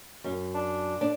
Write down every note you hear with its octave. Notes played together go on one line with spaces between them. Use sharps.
F#2
D4
D4